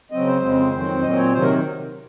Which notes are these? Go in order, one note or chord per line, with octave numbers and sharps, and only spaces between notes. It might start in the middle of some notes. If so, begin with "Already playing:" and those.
C#3 F#3 C4 D#5
C5
F2 C#3 G#3 C4
F2 D#3 F#3 C4
A#2 F#3 C4 D#5
C#5
C3 D#3 F#3 C5
A#4